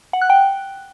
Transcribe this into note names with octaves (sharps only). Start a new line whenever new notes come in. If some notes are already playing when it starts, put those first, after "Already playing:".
F#5
F#6
G5